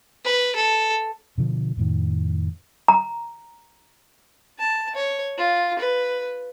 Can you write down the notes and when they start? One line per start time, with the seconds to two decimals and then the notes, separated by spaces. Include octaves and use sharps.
0.25 B4
0.55 A4
1.38 B2 D3 F3
1.77 F2 A2 D#3
2.88 A#5
4.58 A5
4.95 C#5
5.37 F4
5.79 B4